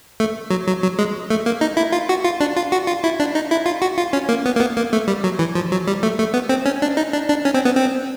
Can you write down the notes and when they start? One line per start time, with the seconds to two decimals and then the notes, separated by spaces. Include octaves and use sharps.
0.20 A3
0.50 F#3
0.67 F#3
0.83 F#3
0.99 G#3
1.30 A3
1.46 A#3
1.61 D#4
1.77 E4
1.92 F4
2.09 F#4
2.24 F4
2.40 D4
2.56 F4
2.72 F#4
2.87 F4
3.04 E4
3.20 D4
3.35 D#4
3.51 E4
3.66 F4
3.82 F#4
3.98 F4
4.13 C#4
4.29 A#3
4.46 B3
4.56 A#3
4.60 B3
4.77 A#3
4.93 A3
5.08 G3
5.24 F#3
5.39 E3
5.55 F3
5.72 F#3
5.88 G3
6.03 A3
6.19 A3
6.34 B3
6.49 C4
6.66 C#4
6.82 D4
6.97 D#4
7.13 D4
7.29 D4
7.45 C#4
7.54 C4
7.65 B3
7.76 C4